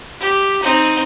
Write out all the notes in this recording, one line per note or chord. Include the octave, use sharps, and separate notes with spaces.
G4
C4 D#4